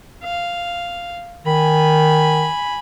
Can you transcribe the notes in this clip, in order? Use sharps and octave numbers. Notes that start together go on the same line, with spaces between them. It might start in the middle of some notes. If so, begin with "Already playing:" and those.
F5
D#3 G#5 B5